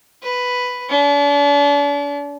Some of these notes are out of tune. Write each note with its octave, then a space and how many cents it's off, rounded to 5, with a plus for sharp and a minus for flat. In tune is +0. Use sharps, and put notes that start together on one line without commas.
B4 +5
D4 -40